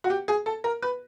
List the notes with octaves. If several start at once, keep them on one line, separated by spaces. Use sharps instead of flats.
F#4
G4
G#4
A4
A#4
B4